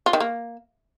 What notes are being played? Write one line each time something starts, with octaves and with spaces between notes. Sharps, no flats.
F4
D#3
A#3